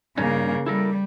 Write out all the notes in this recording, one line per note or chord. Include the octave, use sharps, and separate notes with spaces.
G2 C#3 A#3 C#4 D#4
G3 E4 A4 A#4